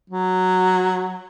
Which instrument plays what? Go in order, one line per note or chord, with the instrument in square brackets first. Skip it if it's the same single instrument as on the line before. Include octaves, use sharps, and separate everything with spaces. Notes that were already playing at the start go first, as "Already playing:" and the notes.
[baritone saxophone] F#3